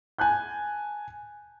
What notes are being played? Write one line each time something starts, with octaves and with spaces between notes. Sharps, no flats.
G#5 A5 F#6 G6